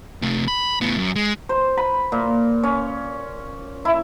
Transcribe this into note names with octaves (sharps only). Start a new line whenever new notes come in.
C3 A3
B5
A2 B3
F#2
G#3
C5
B5
A#2
C#4
E4